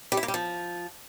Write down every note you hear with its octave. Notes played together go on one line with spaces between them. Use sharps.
G3
E4
A#3
G3
F3